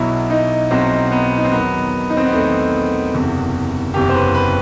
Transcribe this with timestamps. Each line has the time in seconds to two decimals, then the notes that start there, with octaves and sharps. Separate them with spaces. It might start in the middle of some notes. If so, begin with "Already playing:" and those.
Already playing: B1 B2 F#3 E4
0.30 D#4
0.71 B1 B2 F#3 C4
1.11 B3
1.37 D#4
1.45 C4
1.52 E2 D#3 F#3 B3
2.10 D#4
2.17 C4
2.25 B3
2.32 E2 D#3 F#3 A3
3.13 F#1 E2 C3
3.93 F#1 E2 C3 G4
4.09 C5
4.14 B4
4.34 B4